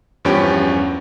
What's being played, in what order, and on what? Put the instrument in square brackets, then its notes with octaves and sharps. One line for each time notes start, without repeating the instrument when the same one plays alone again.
[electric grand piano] E2 G2 F3 C#4 G4 G5